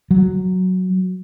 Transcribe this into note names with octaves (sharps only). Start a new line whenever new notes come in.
F#3